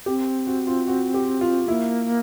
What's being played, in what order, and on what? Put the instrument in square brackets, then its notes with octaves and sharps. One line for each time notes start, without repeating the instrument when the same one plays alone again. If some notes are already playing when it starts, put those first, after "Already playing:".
[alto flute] C4 [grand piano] G4
[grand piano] F#4
F4
F#4
G4
F4
[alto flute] A#3 [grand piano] E4